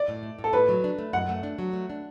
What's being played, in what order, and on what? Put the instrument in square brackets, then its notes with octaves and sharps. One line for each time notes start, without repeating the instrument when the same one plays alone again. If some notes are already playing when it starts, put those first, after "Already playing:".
Already playing: [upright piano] D5
[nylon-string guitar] A2
A3
A2
[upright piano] A4
[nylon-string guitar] A2 [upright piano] B4
[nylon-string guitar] F#3
D4
A3
[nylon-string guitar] F#2 [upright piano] F#5
[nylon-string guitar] A3
D4
F#3
A3
D4